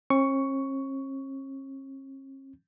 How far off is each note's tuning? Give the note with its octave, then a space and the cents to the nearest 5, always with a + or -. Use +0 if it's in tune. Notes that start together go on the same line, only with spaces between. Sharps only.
C#4 -45 C#6 +10